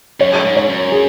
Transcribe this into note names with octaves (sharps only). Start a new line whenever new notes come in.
F#2 C#5
G#2
C#5
F#2
G#4